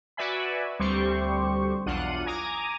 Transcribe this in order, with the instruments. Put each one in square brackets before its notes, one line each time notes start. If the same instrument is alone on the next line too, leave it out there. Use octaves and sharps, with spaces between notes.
[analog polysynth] F#4 B4 D5 E5 G#5 B5
D2 G3 C4 G4 C5 C#6
B1 E2 D4 F4 F#5 D#7
G#5 A#5 D6 D#6